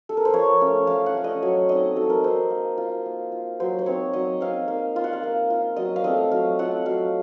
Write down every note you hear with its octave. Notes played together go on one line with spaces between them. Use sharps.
A4
A#4
C5
F3 C#5
A3 C#4
F3 F5
F#5
A3 C#4
D#5
F#3 C#5
C4 D#4 D#5
F#3 A4
A#4
C4 D#4 C5
A#3
F4
A#3
F4
F#3 C5
C5
C4 D#4 C#5
F#3 D#5
C4 D#4 F5
A#3 F5
F4 F5
F#5
F5
A#3
F4
F#3 D#5
F5
A3 C4 F4 D#5
F#3 F5
A3 C4 F4 F#5
F#3 F5